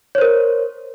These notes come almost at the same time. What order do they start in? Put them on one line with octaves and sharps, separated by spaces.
C#5 C5 A#4